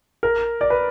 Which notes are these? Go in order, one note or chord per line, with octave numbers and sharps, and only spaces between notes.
A#4
D5
B4